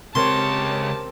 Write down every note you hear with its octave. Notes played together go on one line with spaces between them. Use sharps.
C#2 C4 G4 A#4 C#5 A5 C6